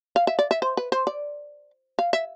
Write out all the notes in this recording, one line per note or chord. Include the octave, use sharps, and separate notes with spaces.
F5
E5
D5
E5
C5
B4
C5
D5
F5
E5